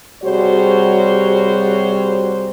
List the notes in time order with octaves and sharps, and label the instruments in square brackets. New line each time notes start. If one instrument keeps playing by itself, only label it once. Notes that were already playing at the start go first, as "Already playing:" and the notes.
[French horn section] C3 G3 F#4 G#4 C5 C#5